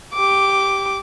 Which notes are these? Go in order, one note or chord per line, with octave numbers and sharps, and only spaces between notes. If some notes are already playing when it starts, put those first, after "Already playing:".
G4 D6